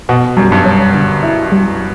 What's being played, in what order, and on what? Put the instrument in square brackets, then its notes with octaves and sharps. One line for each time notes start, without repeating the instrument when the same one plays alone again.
[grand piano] B2 [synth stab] F#4
[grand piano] F#2 [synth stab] G3
[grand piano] G2
[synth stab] C#4
D3
E4
G3